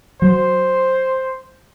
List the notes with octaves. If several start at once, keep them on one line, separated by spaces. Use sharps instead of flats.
F#3 C5